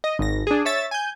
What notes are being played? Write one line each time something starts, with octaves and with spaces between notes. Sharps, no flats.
D#5
G#1 A#6
D4 G#4
C#5 E5 A6
G#5 G6